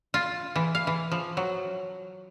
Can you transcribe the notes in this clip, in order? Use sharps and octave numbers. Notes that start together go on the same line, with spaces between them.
F4
E3
F5
E3
F3
F#3